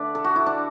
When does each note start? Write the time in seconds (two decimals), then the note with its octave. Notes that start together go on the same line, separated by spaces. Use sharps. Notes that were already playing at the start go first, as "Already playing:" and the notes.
Already playing: D3 A3 B4 D5
0.15 A4
0.24 F#4
0.36 E4
0.46 D4